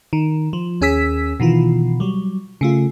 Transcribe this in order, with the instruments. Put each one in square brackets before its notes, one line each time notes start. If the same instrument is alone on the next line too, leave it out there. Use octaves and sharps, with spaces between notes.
[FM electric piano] D#3
F3
D#2 C#4 G#4 E6 B6
B2 D#3 E3 F4
F#3 G3
C#3 A3 F4